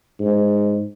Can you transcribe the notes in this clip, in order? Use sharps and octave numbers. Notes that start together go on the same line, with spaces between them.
G#2